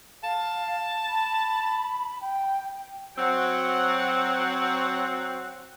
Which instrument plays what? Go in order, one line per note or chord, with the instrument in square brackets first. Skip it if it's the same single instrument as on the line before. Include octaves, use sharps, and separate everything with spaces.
[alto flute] F5 [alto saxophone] A5
[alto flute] B5
G5
[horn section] F#3 C4 F#5